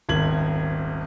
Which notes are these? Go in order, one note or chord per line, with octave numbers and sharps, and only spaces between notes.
D#1 G#1 G#6 F#7